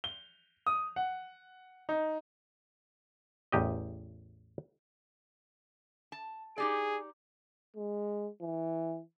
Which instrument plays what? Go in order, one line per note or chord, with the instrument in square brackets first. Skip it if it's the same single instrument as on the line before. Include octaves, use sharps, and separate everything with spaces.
[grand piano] G7
D#6
F#5
D#4
[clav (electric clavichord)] A1 E2 G4 D#5
[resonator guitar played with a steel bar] A5
[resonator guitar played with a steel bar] D#4 G4 D5 [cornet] G#4
[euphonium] G#3
E3